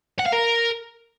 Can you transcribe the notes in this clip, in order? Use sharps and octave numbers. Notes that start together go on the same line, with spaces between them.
F#5
F5
A#4